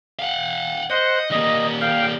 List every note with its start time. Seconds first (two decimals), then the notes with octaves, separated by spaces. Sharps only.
0.19 F5 F#5
0.90 C5 D#5 F#5
1.31 G3 A#3 D#5
1.81 F5 G5